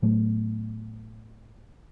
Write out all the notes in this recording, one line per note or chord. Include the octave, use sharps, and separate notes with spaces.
A2 F#3 A3 B3